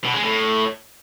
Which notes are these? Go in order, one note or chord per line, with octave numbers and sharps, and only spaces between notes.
B2
G#3
A2